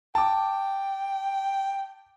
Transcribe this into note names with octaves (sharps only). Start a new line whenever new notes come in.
G5 A5 D6